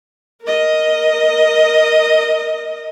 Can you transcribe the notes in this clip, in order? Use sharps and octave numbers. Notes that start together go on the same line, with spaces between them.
A#4 D#5